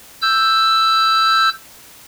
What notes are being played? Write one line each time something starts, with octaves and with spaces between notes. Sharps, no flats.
E6 G6